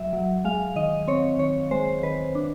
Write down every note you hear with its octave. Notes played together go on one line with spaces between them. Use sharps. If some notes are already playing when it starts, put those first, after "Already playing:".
Already playing: F#3 E5
F#3
G#3 F5
D#3 D#5
C4 C#5
D#3 C#5
G#3 C5
D#3 B4
D4